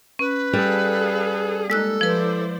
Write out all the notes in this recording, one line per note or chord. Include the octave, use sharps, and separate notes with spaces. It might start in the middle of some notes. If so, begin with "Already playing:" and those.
C#4 B4
G3 G#4 A4 F5
G#3 A#3 D#4 A4 E6 F#6
F3 E4 B4 C5 D5